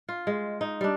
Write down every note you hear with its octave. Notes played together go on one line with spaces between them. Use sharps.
F4
G#3
D#4
G3 D4